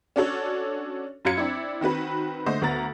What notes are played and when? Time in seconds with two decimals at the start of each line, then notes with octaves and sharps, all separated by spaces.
0.16 C#4 D4 F#4 A4 C#5 D5
1.25 F#2 F#3 F4 G#6 C#7
1.37 C4 D4 E4
1.81 D#3 C4 F#4 B4
2.46 D3 A3 C5 D#5
2.62 D2 B3 A#5 A6